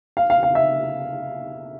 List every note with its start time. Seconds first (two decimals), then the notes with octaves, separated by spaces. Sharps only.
0.17 F5
0.30 F5
0.43 F5
0.55 E5